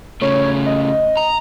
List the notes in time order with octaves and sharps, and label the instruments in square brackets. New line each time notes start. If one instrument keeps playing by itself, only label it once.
[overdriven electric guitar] C#3 A3 [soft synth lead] C#5
[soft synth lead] D#5
[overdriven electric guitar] A#5